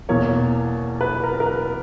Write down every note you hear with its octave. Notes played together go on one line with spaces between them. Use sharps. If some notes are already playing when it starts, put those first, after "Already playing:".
E2 B2 A#3 C#5
B4
A#4
A#4
B4